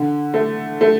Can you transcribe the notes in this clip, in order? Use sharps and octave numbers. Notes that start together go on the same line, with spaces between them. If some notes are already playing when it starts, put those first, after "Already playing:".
Already playing: D3
A3
A3